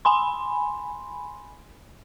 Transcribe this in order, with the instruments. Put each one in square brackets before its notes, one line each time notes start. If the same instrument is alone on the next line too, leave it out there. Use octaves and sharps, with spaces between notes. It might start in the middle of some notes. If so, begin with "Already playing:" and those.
[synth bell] G#5 B5 C6